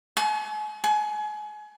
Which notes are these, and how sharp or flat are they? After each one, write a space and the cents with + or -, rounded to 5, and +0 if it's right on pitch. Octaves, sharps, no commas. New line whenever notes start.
G#5 +40
G#5 +30